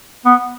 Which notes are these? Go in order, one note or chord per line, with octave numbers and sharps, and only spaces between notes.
B3